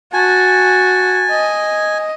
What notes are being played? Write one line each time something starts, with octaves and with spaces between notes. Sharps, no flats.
F#4 G#5 A5
D#5